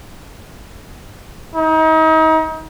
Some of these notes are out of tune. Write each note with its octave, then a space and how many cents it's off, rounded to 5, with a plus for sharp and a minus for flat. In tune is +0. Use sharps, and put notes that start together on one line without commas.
D#4 +35